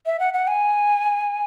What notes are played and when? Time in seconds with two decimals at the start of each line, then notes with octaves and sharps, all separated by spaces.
0.06 E5
0.20 F#5
0.34 F#5
0.47 G#5